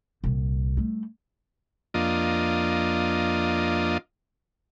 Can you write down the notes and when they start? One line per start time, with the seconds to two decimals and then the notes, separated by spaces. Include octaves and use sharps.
0.24 C2 A#2
0.77 G3 A3
1.94 F2 A#3 D4 F4 D#5